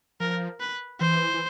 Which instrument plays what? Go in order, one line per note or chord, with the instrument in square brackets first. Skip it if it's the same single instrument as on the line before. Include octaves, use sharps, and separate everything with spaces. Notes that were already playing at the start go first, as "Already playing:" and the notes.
[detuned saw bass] F3 [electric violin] A#4
[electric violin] B4
[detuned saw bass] E3 [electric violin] C5
[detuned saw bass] E3